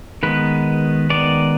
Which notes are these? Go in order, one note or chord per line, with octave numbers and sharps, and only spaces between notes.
D#3 G#3 B3 B4
D#3 G#3 B3 D5